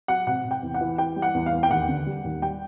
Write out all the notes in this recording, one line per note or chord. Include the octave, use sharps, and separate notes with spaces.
F#3 F#5
C3 F#5
C3
G5
E2
F#5
E3
E3 G5
G3
F#5
E2
F5
E2
G5
D#2 F#5
D3
G3
D#2
G3 G5